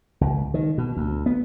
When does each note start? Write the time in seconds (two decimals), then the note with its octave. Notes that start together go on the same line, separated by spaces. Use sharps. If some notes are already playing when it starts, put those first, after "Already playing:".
0.21 C#2
0.54 D#3
0.78 B2
0.97 D2
1.26 B3